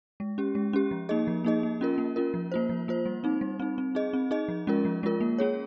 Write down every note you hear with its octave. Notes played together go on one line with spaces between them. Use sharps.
G#3
C#4 G4
G#3
C#4 G4
F3
A#3 D#4 G#4 D#5
F3
A#3 D#4 G#4 D#5
A#3
C#4 F4 A#4
A#3
C#4 F4 A#4
F3
A#3 F4 C5
F3
A#3 F4 C5
G3
C4 D#4
G3
C4 D#4
C4
D#4 G#4 D#5
C4
D#4 G#4 D#5
F3
G#3 C#4 F4 A#4
F3
G#3 C#4 F4 A#4
A#3
C#4 G#4 C#5